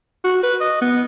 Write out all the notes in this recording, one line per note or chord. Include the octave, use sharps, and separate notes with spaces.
F#4
B4
D#5
B3